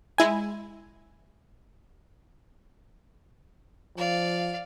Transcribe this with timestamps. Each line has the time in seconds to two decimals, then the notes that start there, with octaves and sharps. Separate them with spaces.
0.18 G#3 E4 G#5
3.97 F3 D5 F5